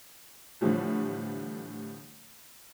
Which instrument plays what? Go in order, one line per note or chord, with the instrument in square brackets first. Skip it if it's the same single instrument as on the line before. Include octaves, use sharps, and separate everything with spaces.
[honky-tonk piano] A2 D3 E3 F3 G3 A3